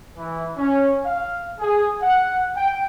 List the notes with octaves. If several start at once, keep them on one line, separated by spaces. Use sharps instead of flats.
E3
C#4
F5
G#4
F#5
G5